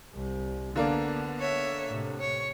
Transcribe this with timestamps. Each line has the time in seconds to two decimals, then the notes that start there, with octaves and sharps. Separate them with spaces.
0.14 C2 C3
0.76 D3 A#3 B3 D4
1.39 C#5 E5
1.88 A2 C3
2.20 C#5